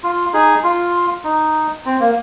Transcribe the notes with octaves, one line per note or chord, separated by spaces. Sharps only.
F4
D#4 G#4
F4
D#4
C4
A#3